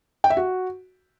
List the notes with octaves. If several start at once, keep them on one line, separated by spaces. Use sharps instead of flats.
G5
E5
F#4